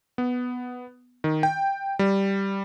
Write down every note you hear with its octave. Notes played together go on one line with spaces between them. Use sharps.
B3
D#3
G5
G3